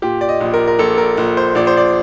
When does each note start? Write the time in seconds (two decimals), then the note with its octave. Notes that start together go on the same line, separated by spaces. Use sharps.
0.02 A#2 G4
0.21 D5
0.29 D#5
0.41 A#1
0.54 A#4
0.67 A#4
0.79 A#1 A4
0.98 A#4
1.17 A#1
1.37 C5
1.55 A#1 D5
1.67 C5
1.77 D5